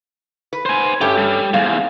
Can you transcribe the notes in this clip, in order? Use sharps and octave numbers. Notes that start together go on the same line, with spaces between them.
B4
C5 G#5
G2 A3 C#4 G4
G3
E2 G#2 F5